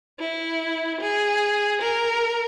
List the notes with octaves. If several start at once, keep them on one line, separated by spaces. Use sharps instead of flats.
E4
G#4
A#4